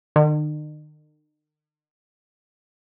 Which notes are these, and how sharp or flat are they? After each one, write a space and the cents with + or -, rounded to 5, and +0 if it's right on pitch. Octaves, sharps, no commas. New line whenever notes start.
D#3 -45